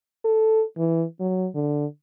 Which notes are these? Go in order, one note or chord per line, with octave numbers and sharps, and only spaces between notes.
A4
E3
F#3
D3